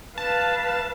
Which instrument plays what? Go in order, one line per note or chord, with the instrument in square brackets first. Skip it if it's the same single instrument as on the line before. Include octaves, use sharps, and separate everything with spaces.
[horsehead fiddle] B4 F5 [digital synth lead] A5